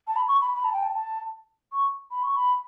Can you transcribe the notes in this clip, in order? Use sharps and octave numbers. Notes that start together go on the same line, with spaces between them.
A5
B5
C#6
B5
B5
A5
G5
A5
A5
C#6
B5
C#6
B5